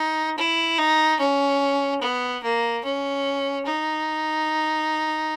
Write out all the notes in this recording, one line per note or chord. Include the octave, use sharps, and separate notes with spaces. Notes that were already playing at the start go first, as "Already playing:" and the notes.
Already playing: D#4
E4
D#4
C#4
B3
A#3
C#4
D#4